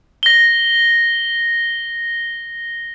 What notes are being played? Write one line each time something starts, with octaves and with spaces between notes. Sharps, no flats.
A#6 G7